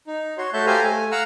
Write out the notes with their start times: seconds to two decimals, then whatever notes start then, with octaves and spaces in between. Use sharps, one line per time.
0.07 D#4
0.38 F#4 C#5 C6
0.53 A3 F#4 C#5 E5 A5 G6
0.66 G4 A4 C5 F5 G#5 A#5
0.83 A3 G#5
1.12 F5 F#5 A#5 E6 F6